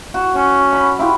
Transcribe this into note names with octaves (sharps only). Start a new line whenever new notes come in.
F#4
C#4 C#5
B5
E4 F4 G4